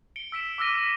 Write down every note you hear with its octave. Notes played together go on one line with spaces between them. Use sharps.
C#7 D7 G7
E6 B6 D7 E7
D6 E6 F6 A#6 D#7
F6 A#6 B6 D7